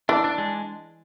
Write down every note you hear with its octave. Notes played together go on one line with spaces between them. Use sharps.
E3 D4
D4
G#3